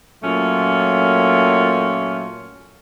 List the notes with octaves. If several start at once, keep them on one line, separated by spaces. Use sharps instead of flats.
A#2 F#3 A3 C#4 F4